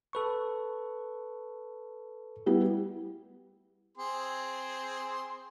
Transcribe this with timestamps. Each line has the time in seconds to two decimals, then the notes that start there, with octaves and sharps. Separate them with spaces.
0.13 A4 B4 C#6
2.46 G3 B3 E4
3.98 C4 G#4 C6